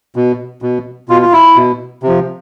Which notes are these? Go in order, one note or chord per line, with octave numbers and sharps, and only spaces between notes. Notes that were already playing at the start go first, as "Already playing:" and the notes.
B2
B2
B2 F4
F4
E4
B2
C3 F3